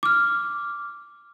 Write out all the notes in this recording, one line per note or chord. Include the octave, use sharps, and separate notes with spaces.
D6 F6